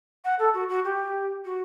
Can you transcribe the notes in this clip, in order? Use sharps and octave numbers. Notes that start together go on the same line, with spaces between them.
F#5
A4
F#4
F#4
G4
F#4